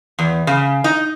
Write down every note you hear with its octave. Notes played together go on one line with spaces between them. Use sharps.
E2
C#3
D#4